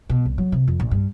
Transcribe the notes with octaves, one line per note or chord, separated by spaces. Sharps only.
B2
C2
F#3
C3
F2
A#1
G2